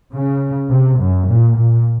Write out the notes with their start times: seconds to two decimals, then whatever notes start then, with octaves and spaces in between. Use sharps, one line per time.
0.12 C#3
0.70 C3
0.99 F#2
1.27 A#2
1.56 A#2